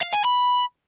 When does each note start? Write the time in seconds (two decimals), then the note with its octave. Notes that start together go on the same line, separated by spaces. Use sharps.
0.01 F5
0.13 G#5
0.24 B5